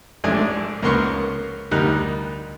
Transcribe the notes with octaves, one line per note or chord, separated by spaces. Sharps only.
A1 G#2 A3 D4 G#5 D#6
C#2 A#3 B3 A#4 C6 C#6
D2 G3 D#4 A#4 F#6